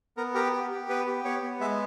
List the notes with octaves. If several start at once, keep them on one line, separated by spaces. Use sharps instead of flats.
B3 A#4
G4 A#4
G4
G4
B3 B4
G4
B3 C#5
B3
G#3 E5